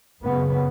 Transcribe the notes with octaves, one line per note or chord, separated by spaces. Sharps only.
F#2 C#3 B3